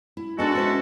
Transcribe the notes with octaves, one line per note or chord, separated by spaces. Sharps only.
E4
G#3 B3 D4 D#4 F#4 A4
C#4 C5 E5